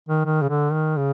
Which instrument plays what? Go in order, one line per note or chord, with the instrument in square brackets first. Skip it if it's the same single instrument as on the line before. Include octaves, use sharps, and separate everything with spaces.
[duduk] D#3
D#3
C#3
D3
D#3
C#3